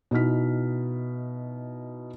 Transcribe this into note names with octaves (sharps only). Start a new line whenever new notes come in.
B2 D#4 E4 F#4 F6 B6